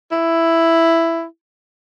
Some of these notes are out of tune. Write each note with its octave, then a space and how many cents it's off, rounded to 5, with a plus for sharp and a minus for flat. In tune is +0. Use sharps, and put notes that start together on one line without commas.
E4 +5